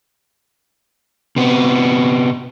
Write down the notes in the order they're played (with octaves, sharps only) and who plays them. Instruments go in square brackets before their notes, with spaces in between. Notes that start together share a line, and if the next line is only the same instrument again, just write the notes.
[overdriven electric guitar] C3 B3